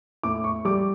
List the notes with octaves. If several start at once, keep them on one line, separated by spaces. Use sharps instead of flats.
A2 D6
C#6
G3 D6